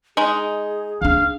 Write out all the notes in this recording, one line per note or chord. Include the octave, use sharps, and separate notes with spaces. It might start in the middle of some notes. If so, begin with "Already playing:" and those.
G#3 D#4 G#4
D3 D4 F5